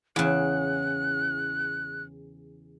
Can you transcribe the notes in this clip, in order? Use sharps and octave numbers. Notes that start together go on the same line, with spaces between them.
E2 C#3 F#6